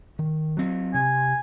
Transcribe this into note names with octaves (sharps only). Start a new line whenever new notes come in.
D#3
F#3 C4
C3 G#5